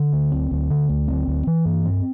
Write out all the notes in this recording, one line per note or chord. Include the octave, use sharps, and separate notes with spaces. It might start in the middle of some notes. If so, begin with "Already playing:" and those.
Already playing: D3
D2
C4
D2
D3
D2
C4
D2
E3
G2
C4